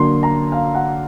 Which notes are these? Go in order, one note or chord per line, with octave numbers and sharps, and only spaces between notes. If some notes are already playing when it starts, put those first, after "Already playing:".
Already playing: D3 F#3 A#3 C6
A#5
F5
F#5